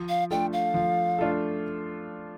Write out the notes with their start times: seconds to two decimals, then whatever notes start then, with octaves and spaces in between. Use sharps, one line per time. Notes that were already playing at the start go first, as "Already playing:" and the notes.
Already playing: F3
0.09 F5
0.31 A3 D4 F4 A4 G5
0.53 F5
0.74 F3
1.19 A3 D4 F4 A4